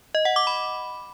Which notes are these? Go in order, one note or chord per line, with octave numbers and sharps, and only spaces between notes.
D#5
F#5
D6
B5